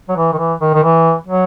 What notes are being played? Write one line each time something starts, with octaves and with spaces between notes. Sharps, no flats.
F#3
E3
D#3
E3
D#3
D#3
E3
F#3